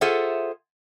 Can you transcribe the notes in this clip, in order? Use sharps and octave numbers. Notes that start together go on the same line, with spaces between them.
F4 G#4 A4 C5 E5 F#5